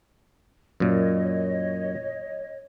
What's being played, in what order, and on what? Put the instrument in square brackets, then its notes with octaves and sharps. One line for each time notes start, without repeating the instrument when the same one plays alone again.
[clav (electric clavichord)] F#2 A#2 [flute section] C#5 D#5